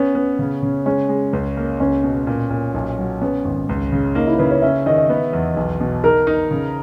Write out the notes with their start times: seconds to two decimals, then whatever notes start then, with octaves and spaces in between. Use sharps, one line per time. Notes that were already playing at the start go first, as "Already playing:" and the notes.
Already playing: B3 C#4
0.15 B3
0.39 C#3
0.63 C#3
0.86 G#3 C#4
1.09 G#3
1.33 C#2
1.57 A#3
1.80 C#2 C#4
2.04 B2
2.27 A#2
2.50 A#2
2.74 B1
2.98 F#3
3.22 B3 C#4
3.45 G#1
3.69 C#2
3.92 C#3
4.15 A#3 D#4
4.27 E4
4.38 C#3 B4
4.51 C#5
4.62 C#4 E5
4.86 D#3 D#5
4.98 D#5
5.09 B3 B4
5.33 E2
5.57 B1
5.80 B2
6.04 D#4 A#4
6.27 D#4
6.51 C#3